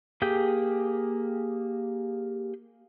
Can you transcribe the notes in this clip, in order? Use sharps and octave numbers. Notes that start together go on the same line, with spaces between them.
A#3 G4 G#4 G5 G6